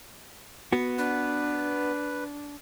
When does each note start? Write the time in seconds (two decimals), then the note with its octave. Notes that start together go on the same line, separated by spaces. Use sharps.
0.73 B3 F#4
0.98 D4 B4